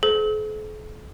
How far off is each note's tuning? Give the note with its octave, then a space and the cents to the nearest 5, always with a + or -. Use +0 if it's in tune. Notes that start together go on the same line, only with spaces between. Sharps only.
A4 -45 C5 -30